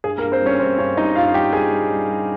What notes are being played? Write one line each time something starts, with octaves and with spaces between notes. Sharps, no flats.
G2 G#4
A#3 A#4
G2
C4 C5
G3 C#4 C#5
G2 C4 C5
G2 C#4 C#5
G3 D#4 D#5
G2 F4 F5
G2 G4 G5
G3 G#4 G#5
G3
G3
G3